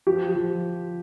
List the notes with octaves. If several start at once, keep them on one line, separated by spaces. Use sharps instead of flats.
F3 G4
F3